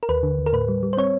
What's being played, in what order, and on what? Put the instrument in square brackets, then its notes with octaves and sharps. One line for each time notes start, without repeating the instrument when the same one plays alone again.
[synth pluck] A#4
D#2 B4
D3
D#2
A#4
A2 B4
G3
G3
C5
C4 C#5